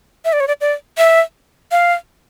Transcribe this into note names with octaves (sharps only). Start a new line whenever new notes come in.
E5
D5
C#5
D5
D5
E5
F5